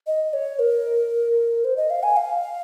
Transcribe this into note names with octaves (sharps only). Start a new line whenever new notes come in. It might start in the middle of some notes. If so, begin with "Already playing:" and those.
D#5
C#5
A#4
C5
D#5
F5
G#5
F5